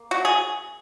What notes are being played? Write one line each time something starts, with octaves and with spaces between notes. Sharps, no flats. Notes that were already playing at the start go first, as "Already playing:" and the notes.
Already playing: A#3
F#4
G#4